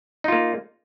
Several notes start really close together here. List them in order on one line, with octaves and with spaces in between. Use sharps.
D#4 F4 A#3